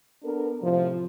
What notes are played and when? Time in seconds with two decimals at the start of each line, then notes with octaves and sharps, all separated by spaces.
0.24 B3 D4 A4 A#4
0.62 A2 C3 F3